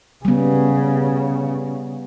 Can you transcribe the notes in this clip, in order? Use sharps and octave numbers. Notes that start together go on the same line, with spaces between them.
C#3 G3 B3